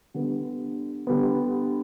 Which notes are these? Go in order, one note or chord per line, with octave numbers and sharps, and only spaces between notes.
D3 G3 B3
D3 G3 B3